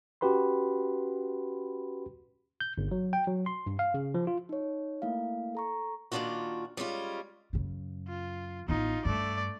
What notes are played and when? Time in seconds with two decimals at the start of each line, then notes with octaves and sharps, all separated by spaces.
0.21 C#4 F#4 G4 B4 B5 C6
2.61 G6
2.78 G1
2.91 F#3
3.13 G5
3.27 F#3
3.46 C6
3.66 G2
3.79 F5
3.94 C#3
4.14 F3
4.27 F4
4.49 D#4 C#5
5.02 A3 A#3 E4 F5
5.55 A4 A#5 C#6
6.12 A#2 D#3 G#3 D4 F4 F#4
6.77 G3 G#3 C#4 F4
7.53 F#2 C#3
8.08 F4
8.68 A1 B3 D#4 F4
9.05 G2 A3 D5